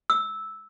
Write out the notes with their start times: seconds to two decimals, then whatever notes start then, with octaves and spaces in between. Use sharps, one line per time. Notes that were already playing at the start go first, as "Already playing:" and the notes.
0.10 E6